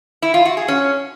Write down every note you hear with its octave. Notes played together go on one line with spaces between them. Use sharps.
E4
F4
F#4
G#4
C#4